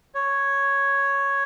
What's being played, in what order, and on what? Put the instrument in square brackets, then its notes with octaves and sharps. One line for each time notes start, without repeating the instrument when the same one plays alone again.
[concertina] C#5